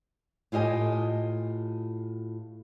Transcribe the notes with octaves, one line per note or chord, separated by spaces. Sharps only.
A2 F4 G4 D#5 G#5